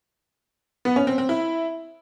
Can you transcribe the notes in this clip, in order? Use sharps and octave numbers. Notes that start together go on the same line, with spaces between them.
B3
C#4
C4
C4
E4